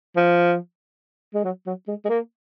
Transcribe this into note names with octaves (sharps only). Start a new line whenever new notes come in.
F3
G#3
F#3
F#3
G#3
G#3
A#3